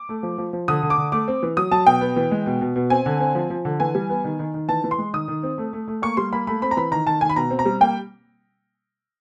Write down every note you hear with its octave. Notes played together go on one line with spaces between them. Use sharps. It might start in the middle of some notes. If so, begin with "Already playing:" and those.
Already playing: D6
A3
F3
F3
F3
D3 D#6
D3
D6
D3
A3 D6
C4
E3
F#3 D#6
F#3 A5
B2 G5
B3
E3
G#3
B2
B2
B2
C4 G#5
D3
C4
F3
F3
D3
E3 G#5
G3
B3
D#3
D#3
D#3
E3 A5
E3
C6
G#3
D#3 D#6
D#3
C4
A3
A3
A3
A#3 C#6
G3 C6
A#3 B5
A3 B5
C4 B5
A#5
E3 B5
D#3 A#5
D#3 A5
D#3 G#5
B5
B2 A#5
C4
A#5
G3
A#3 G5